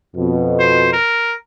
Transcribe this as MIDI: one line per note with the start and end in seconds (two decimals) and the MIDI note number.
0.16 0.94 41
0.16 0.94 47
0.60 0.91 72
0.93 1.34 70